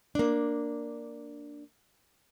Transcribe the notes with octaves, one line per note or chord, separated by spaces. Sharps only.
A#3 D4